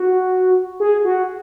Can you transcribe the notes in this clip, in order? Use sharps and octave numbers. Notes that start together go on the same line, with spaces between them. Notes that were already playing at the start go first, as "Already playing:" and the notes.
Already playing: F#4
G#4
F#4